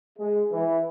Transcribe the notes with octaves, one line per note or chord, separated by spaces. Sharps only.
G#3
E3